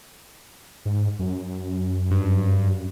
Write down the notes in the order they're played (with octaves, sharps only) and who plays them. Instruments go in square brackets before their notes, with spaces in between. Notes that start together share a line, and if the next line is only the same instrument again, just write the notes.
[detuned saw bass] G#2
F#2
[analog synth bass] G2